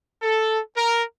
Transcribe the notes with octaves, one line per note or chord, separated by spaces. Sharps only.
A4
A#4